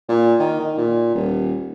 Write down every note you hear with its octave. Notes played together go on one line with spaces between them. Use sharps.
A#2
D#3
D#3
A#2
D#1